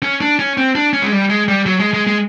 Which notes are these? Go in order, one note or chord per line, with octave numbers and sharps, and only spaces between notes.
C#4
D4
C#4
C4
D4
C#4
G#3
G3
G#3
G3
F#3
G#3
G#3
G#3